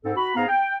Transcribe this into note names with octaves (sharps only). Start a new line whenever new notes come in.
G#2 C4 A4
F#4 B5
G#2 B3 G#4 F5 A#5
G5